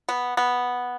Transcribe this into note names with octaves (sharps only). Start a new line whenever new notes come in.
B3
B3